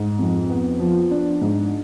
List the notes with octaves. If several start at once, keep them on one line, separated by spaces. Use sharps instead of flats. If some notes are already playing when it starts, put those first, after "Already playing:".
Already playing: G#2
F2
B3
F3
D4
G#2